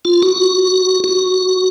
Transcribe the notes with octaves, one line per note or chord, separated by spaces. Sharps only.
F4
F#4
F#4